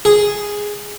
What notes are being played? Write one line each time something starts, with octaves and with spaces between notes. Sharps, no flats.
G#4